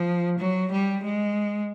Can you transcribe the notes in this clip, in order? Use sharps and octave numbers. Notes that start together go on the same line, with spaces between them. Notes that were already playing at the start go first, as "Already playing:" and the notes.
Already playing: F3
F#3
G3
G#3